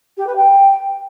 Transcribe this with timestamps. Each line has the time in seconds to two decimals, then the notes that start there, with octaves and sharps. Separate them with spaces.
0.17 G4
0.26 B4
0.36 G5